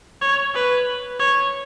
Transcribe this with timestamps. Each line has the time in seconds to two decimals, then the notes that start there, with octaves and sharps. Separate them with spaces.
0.21 C#5
0.54 B4
1.19 C#5